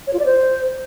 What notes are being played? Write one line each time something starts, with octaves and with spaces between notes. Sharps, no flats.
C#5
F4
D5
C5